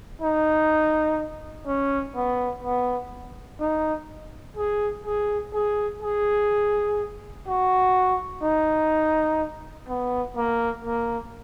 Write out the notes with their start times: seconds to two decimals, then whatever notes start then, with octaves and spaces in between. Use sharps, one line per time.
0.22 D#4
1.67 C#4
2.16 B3
2.63 B3
3.60 D#4
4.57 G#4
5.05 G#4
5.54 G#4
6.02 G#4
7.47 F#4
8.43 D#4
9.88 B3
10.37 A#3
10.85 A#3